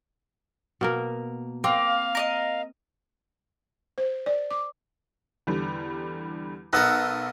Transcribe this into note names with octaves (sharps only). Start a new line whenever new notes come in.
B2 A#3 A#4
A#3 C4 F5
A#4 D5 D#5
C5
D5
D6
E2 D3 G3
B1 B3 A4 A#4 D#5 F#5 E6